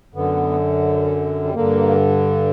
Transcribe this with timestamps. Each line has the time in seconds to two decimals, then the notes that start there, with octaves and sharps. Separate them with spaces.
0.14 F#2 D3 B3
1.44 G3
1.54 G2 D3 A#3